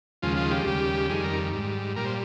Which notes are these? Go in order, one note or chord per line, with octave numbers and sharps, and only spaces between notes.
D#2 C#3 F3 G#3 F4
F4
G4
D#2 C#3 G3
F2 D#3 G3 G#4
A#4
G#2 G3
A#2 G3 A#4
C5